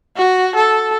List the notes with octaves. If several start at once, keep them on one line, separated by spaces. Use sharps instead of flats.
F#4
A4